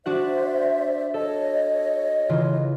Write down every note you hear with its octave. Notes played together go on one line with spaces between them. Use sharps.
D4 F#4 C5 D5 E5 F#5
A4 C#5 D#5
C#3 E3 F4